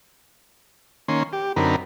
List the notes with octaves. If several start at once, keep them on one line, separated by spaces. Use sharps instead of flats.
D#3 A#3 C#4 C6
G4
F#2 D3 C4 D#4 A#4 B5